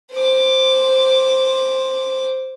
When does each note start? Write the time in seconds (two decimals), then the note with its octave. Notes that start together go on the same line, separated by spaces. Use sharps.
0.12 C5 D6